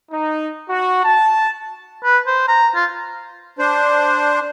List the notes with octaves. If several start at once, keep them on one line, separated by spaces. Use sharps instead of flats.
D#4
F#4
A5
B4
C5
A#5
F4
D4 C5